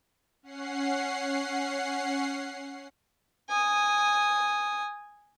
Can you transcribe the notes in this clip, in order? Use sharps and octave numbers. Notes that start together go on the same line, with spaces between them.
C#4 F#5 C7
G#5 D#6